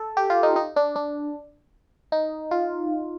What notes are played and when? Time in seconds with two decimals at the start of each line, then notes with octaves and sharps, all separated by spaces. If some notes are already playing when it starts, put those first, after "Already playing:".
Already playing: A4
0.17 G4
0.30 F4
0.43 D#4
0.56 D#4
0.76 D4
0.96 D4
2.12 D#4
2.51 F4